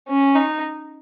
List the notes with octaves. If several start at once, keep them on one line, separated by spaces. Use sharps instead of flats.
C#4
D#4